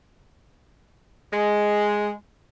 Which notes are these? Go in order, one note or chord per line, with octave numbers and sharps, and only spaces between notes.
G#3